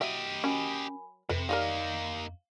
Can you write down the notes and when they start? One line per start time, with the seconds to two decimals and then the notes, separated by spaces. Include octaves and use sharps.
0.01 F#3 G4 D#5 E5
0.44 F#3 C#4 A#4 G#5 B5
1.29 F2 C3 A4 B4
1.49 D#3 G3 A#3 D#4 A#4 F5